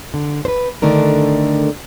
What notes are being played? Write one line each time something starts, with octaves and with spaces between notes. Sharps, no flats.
D3
B4 C5
D3 D#3 A3 D4 A#4